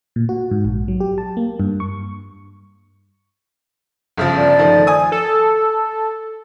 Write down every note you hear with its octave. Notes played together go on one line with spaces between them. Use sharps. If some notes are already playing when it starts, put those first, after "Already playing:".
A#2
F#4
G#2
A#1
F#3
G4
A5
A#3
G2
C#6
G1 C#3 F3
D5
D#3 F3 A3
G#5 D#6
A4